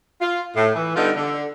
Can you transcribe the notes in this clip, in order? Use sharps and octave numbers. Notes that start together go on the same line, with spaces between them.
F4
A2
E3
D3 G3 B3 D#4 F4
D3